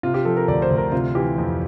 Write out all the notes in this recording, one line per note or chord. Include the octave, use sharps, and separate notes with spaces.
C3 F4
G4
F3 A4
A#4
D2 D5
C5
D2
A#4
C3 F4
E3 G4
F2